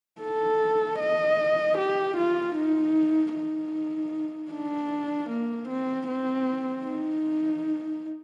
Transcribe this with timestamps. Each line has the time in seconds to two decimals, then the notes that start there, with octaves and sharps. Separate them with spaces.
0.21 A4
0.99 D#5
1.78 G4
2.17 F4
2.56 D#4
3.34 D#4
4.51 D4
5.30 A#3
5.69 C4
6.08 C4
6.85 D#4